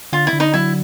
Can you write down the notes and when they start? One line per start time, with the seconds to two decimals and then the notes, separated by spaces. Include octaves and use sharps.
0.12 D3 F4
0.27 E4
0.33 D3
0.40 D#4
0.54 F#3 E4